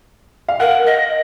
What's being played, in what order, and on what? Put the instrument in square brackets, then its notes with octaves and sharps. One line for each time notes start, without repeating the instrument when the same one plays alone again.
[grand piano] F5
[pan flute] A#4 [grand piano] F#5
[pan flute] D#5